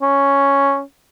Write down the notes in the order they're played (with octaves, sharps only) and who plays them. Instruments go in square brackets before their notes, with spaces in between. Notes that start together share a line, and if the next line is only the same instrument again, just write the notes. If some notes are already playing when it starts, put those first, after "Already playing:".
[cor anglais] C#4